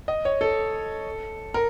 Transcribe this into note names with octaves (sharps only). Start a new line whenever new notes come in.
D#5
C#5
A4
A#4